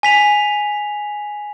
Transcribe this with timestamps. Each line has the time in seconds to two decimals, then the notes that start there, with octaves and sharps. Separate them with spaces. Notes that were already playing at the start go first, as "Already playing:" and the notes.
0.03 G#5 B6 F7